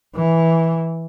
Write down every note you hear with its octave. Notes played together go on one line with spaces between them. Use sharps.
E3